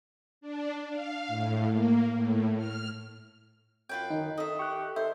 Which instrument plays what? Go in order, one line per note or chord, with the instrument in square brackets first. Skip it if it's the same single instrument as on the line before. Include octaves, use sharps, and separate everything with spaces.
[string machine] D4
F5
A2
A#3
A2
F6
[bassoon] F#2 [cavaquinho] F4 B4 G5
[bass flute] D#3 [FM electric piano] D#4
[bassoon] D#3 [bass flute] A4 [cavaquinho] D#5 E5
[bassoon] G4 [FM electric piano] C#6 F#6
[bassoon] D#3 [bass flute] A4 [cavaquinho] C5 [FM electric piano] E5